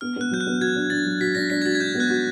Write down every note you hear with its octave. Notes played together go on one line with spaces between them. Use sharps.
B3 F6
B3 F#6
F#3 G6
F#6
B3
F#4 G#6
D4
D4 A6
F#3
F#4 B6
D4 A#6
D4 B6
G#6
F#4 A6
G#6
D4 G6
B3
F#6
F#4